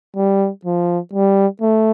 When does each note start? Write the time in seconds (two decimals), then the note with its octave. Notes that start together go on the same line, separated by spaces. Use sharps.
0.16 G3
0.65 F3
1.13 G3
1.62 A3